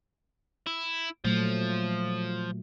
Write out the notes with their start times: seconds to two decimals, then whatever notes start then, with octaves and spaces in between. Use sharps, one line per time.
0.67 E4
1.25 A#2 F3 F#3 A3